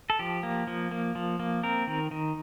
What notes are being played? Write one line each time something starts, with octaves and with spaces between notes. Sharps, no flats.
A4
F3 G4
A#3
F3
A#3
F3
A#3
C4 A#4
D#3
D#3